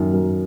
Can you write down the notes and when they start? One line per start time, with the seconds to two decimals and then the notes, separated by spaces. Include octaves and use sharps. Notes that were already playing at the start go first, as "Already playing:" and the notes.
Already playing: F#2 D#3
0.13 F#2